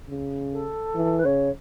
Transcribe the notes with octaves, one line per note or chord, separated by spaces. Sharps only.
C#3
A4
E3
B4
C#3 C#5